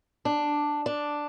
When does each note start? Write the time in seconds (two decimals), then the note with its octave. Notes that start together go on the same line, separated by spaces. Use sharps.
0.25 D4
0.86 D4